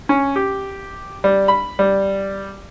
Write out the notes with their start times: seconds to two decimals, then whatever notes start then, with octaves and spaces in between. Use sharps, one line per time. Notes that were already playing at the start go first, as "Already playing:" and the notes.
0.09 C#4
0.36 G4
1.24 G3
1.48 B5
1.79 G3